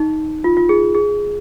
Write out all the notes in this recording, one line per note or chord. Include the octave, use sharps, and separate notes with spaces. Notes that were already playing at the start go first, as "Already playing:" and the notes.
Already playing: D#4
F4
F4
G#4
G#4